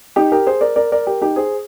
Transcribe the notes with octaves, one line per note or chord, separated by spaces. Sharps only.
D#4 G4
G4 A#4
G#4 C5
A#4 D5
A#4 D5
A#4 D5
G4 A#4
D#4 G4
G#4 C5